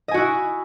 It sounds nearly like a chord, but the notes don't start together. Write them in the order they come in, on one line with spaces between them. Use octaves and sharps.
D#5 G#5 F#4 E4